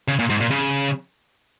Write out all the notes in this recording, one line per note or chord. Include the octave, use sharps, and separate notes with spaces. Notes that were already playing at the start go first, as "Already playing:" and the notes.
C#3
A#2
G#2
A#2
C#3